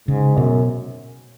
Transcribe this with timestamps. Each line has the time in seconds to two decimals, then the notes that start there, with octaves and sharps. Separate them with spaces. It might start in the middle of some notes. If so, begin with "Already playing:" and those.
0.08 G#2 C#3
0.37 F#2 B2